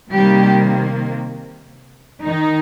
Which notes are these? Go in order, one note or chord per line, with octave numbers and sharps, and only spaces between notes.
C3 D#3 G3 A#3 G4
D#3 D#4